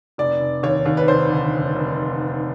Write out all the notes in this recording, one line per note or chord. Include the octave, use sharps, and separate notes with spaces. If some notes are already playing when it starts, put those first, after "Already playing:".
F1 D5
F1
D#2 C#5
D#2
B4
F1 C5
D3
F1
F1